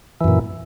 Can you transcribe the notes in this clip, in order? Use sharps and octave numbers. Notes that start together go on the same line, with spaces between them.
F#2 A#2 E3